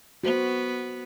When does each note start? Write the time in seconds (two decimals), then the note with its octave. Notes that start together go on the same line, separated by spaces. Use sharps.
0.24 B3 F#4 C5